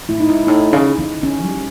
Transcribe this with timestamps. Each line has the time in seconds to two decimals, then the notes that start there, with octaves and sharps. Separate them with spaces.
0.09 A2 E4
0.20 D#4
0.28 G#2 E4
0.47 A2 D#4
0.73 C#3
0.98 C#3
1.23 C#3 C#4
1.42 G3